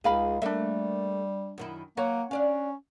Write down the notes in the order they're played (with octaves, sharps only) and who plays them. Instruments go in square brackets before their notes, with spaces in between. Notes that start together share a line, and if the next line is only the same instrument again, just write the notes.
[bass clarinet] C#2 [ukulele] D#4 F5 B5 [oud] G#4
[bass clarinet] G3 [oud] A3 A#3 [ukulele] D4 E5
[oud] F#2 D#3 E4
[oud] F#3 [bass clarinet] A#3 [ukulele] C#5 F#5
[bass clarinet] C#4 [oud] D4 D5 F5